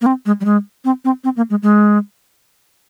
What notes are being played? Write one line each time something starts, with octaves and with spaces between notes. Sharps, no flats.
A#3
C4
G#3
G3
G#3
C4
C4
C4
A#3
G#3
G#3